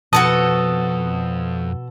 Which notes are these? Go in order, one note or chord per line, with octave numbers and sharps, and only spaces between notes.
F2 B2 F#4 A4 A5 D#6